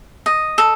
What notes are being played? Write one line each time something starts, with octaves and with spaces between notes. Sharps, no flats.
D#5
A4